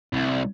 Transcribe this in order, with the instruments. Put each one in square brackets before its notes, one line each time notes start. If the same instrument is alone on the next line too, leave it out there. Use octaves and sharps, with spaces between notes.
[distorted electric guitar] C2